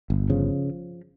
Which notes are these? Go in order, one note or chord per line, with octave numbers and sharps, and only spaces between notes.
G1
C#3 F3